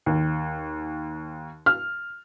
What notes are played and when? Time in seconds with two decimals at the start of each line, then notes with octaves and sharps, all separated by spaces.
0.06 D#2
1.66 F6